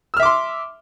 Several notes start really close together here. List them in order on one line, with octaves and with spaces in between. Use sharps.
E6 F6 E5 D6 C6